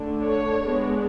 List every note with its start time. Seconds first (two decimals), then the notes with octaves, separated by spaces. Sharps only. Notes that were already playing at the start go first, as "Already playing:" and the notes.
Already playing: D3 A3 D4
0.24 C#5
0.63 G#3 B3 D4